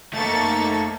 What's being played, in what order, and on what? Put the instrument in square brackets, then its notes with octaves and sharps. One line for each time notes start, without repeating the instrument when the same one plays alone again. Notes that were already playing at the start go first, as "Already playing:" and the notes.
[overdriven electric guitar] A3 D#4 [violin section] A#3 C#6 A6 [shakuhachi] A5